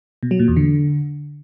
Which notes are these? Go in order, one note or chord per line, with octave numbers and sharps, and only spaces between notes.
B2
F#3
A#2
E2
D3